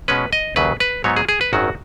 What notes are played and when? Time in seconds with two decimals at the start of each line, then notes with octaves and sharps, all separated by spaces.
0.08 B2 G#3 C#4 B4
0.33 D#5
0.56 D#2 C#3 F#3 B4
0.80 B4
1.04 G#2 F#3 B3 D#4 C#5
1.17 G#4
1.29 G#4
1.41 B4
1.53 G#1 F#2 D#3 F#3 F#4